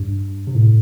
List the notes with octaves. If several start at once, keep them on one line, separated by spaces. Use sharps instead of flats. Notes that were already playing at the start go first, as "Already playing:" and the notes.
Already playing: G2
C3
A2